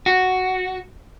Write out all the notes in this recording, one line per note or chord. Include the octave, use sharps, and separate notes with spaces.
F#4